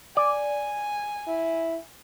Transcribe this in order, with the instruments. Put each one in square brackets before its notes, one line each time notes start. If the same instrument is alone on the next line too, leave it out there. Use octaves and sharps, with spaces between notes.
[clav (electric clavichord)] D5 [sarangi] G#5
[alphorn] E4